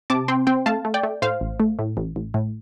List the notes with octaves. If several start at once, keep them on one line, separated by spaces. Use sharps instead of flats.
C3 A5 D6
C4 G5 C6
C4 G5 C6
A3 F5 A5
A3
D5 G5
A3
A2 C5 F5
A1
A3
A2
A1
A1
A2